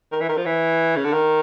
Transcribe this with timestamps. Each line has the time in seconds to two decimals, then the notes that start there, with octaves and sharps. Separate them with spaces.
0.12 D#3
0.21 E3
0.29 D#3
0.37 F3
0.46 E3
0.96 C#3
1.05 D3
1.13 D#3